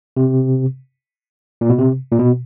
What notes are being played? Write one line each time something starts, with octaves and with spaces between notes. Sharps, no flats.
C3
A#2
B2
C3
A#2
B2